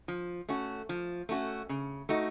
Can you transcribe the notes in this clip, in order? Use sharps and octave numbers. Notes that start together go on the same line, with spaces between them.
F3
A3 C#4 F#4
F3
A3 C#4 F#4
C#3
A3 D#4 F#4